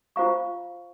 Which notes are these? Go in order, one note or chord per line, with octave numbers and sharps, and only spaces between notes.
F4 C5 F5 A#5 C#6